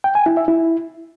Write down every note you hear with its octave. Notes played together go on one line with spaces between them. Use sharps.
G5
G#5
E4
E5
E4